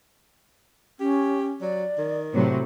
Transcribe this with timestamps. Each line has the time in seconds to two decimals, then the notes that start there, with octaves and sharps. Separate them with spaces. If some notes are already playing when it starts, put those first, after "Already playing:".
1.00 C#4 G4
1.62 F#3 D5
1.98 D#3
2.33 A2 C3 F#3 C5